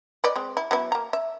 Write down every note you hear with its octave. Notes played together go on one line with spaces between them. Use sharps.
B4 D5 D#5
G#3 C4
E4
F#3 B3 E4
A#3 A#5
E5